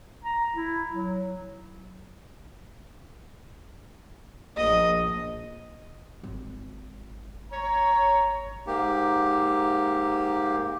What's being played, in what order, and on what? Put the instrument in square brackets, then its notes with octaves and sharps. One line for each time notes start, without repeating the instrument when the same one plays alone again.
[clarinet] A#5
E4
F#3
[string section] A#1 [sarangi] D#5
[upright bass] G#1
[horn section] C#5 A#5
[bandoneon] G#2 A#3 G4